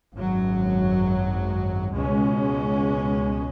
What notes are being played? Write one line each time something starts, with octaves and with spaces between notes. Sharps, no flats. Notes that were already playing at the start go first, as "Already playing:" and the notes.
G#1 F#2 F#3
C#2 B2 G#3 C#4